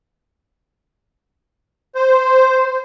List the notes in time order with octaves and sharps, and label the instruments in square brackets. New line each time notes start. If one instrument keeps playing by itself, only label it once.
[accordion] C5